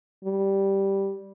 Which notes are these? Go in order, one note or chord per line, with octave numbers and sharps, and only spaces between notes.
G3